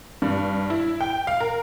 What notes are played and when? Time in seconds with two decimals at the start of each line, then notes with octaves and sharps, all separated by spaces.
0.22 G2
0.70 E4
1.01 G5
1.27 F5
1.40 A#4